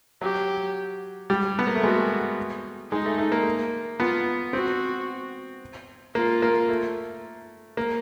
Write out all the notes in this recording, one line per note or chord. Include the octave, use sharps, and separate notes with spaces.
F#3 G4
G3
B3
A#3
A3
G#3 F#4
G#3 D#4
A3
A3
A#3
B3 F4
C4 F#4
A#3 F4
A#3
A3
A#3